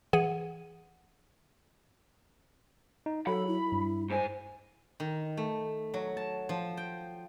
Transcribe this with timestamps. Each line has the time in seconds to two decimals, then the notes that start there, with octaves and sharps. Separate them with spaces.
0.13 E3 G#4 F#5 D#7
3.06 D#4
3.27 F#3 A4 B5
3.47 E4
3.72 G2
4.10 G#2 C5 G#5
5.00 D#3
5.37 A3
5.94 F#3
6.17 A5
6.49 F3
6.77 G5